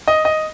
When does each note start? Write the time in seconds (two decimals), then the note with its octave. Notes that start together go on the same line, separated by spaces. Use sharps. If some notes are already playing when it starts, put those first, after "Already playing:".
0.08 D#5
0.25 D#5